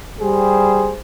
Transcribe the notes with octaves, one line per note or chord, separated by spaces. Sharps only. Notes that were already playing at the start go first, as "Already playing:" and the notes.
G3 G4 G#4 C5